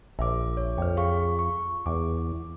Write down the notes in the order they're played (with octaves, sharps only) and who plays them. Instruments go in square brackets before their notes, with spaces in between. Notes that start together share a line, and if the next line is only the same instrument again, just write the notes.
[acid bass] A#1 [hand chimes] E5 D6
[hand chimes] C#5
[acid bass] F2 [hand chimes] G5 F6
[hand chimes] G#4 F5 C#6
C#6
[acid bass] E2 [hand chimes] D6